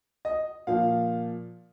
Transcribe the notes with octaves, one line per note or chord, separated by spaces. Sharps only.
D#5
A#2 F3 F5